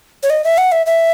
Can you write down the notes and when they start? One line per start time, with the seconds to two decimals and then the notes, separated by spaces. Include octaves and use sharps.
0.23 C#5
0.30 D#5
0.44 E5
0.58 F#5
0.72 E5
0.86 E5